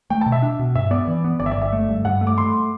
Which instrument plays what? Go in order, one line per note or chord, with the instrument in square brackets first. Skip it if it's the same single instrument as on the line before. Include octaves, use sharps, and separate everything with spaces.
[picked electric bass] A3 [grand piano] G5
[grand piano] A5
[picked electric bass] B2
[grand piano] E5
[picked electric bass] D4
B2
[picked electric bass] G2 [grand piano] E5
[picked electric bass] B3 [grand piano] D5
[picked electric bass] E3
B3
[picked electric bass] G1 [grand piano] D5
[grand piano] E5
D5
[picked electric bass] G1
[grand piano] E5
[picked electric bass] A3
G2
[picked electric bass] G2 [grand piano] F#5
[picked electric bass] A3
[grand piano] D6
[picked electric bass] A3 [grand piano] C6